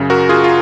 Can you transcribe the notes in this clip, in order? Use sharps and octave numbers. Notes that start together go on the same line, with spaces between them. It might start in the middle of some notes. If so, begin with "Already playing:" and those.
Already playing: F#2 C#3
F#4 A#4
F4 G#4
F4